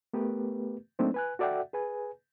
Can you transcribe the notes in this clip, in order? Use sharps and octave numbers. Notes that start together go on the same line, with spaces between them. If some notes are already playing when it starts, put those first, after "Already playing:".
A3 B3 G4 A#4 B4
F#3 A3 A#3 C4 D4 D#4
B4 G#5 F#6
F#4 A4 D5 E5 F#5 G5
G#4 B4 G#5